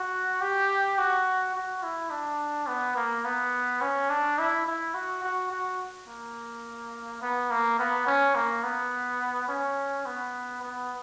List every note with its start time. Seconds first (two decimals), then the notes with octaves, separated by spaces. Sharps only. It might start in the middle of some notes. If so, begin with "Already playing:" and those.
Already playing: F#4
0.41 G4
0.98 F#4
1.55 F#4
1.83 E4
2.11 D4
2.67 B3
2.96 A#3
3.25 B3
3.81 C#4
4.10 D4
4.39 E4
4.66 E4
4.94 F#4
5.23 F#4
5.51 F#4
6.08 A#3
7.22 B3
7.51 A#3
7.79 B3
8.07 C#4
8.35 A#3
8.63 B3
9.48 C#4
10.06 B3
10.62 B3